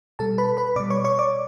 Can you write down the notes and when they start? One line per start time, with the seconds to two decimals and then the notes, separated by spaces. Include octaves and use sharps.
0.19 B2 G3 A4 A5
0.38 B4 B5
0.57 B4 B5
0.76 B2 G3 D5 D6
0.90 C#5 C#6
1.04 C#5 C#6
1.19 D5 D6